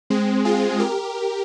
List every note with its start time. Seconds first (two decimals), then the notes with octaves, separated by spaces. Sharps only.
0.10 G#3 C4
0.45 F4 G#4
0.80 G4 A#4